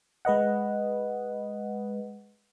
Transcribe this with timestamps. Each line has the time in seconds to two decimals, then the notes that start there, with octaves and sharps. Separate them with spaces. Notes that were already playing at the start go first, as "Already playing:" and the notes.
0.25 G#3 B4 D#5 F#5